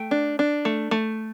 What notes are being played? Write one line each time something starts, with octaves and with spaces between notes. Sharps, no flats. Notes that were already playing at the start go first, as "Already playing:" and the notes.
Already playing: A3 G5
D4
D4
A3
A3